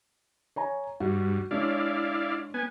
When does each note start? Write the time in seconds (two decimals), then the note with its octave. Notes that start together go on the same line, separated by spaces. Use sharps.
0.56 C#5 G#5 A#5
1.00 G2 F#4
1.51 G#3 D4 E4 C#5 D5 F5
2.54 B3 G#5